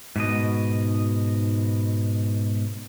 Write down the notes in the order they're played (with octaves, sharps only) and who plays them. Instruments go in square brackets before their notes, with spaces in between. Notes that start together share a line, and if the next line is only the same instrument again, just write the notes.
[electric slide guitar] G#2 B2 D#5